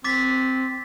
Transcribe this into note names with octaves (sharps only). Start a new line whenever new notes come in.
C4 D6 A6 B6